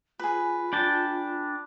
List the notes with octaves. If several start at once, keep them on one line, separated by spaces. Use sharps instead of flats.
F4 G#4 B4
D4 G5 A5